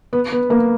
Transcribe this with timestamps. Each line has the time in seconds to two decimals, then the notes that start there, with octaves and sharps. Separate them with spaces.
0.13 B3
0.32 B3
0.50 A#3